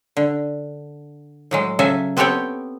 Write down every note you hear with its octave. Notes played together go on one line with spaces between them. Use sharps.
D3
A2 F#3 G#3
C#3 F#3 A4 E5 G#5
B3 C4 G4 A4 C#5 G5